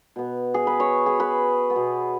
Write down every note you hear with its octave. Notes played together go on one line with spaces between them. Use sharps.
B2 B3
G#4
B4
C#5
G#4
B4
B3
B2